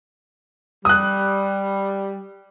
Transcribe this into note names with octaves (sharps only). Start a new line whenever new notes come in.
G3 D#6 F#6